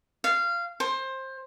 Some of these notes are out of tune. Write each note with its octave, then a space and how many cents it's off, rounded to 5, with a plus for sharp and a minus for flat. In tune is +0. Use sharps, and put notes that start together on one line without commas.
F5 -20
C5 +20